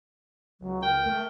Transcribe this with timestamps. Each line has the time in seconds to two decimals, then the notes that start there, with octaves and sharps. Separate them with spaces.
0.61 C#2 F#3
0.82 A#4 G5
1.06 A3 A#4